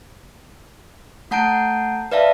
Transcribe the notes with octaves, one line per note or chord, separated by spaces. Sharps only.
A3 F#5 A5 A#5 G6 D7
B4 D5 E5 F5 A5